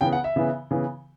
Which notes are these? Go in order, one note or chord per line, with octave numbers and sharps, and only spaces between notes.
C#3 E3 B3 G5
F#5
E5
C#3 E3 B3
C#3 E3 B3